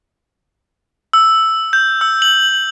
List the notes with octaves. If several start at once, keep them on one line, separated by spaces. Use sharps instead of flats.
E6
G6
E6
F#7